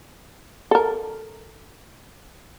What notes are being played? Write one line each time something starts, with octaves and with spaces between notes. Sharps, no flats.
A4 A#4